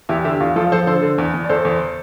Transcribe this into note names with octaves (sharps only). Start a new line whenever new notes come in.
E2 E4 G4
D3 E4 G4
E2 F4
F3 F4 A4
F3 A4 C5
D3 A4 C5
D3
E2
E2
D5
E2 A4 C5
E2